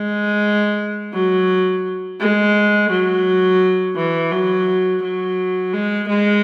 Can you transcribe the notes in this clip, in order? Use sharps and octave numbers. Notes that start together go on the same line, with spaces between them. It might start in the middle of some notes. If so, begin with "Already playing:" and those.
Already playing: G#3
F#3
G#3
F#3
E3
F#3
F#3
G#3
G#3